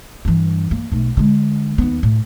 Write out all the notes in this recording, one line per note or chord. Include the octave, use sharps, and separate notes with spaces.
G2 E3
A#3
B1 A3
D3 G#3
D#2 B3
A2